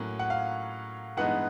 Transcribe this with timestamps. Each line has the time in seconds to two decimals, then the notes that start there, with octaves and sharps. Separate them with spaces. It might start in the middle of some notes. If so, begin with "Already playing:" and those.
Already playing: A2 F#3 A#3 C#4
0.19 F#5
0.30 F5
1.17 G2 E3 G#3 B3 D#4 F#5